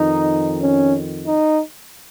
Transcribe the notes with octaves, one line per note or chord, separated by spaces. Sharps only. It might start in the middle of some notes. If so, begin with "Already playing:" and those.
Already playing: F2 D#3 D#4
C#4
D#4